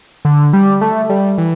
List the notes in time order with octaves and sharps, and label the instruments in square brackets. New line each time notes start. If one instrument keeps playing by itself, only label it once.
[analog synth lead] D3
G3
A3
G3
E3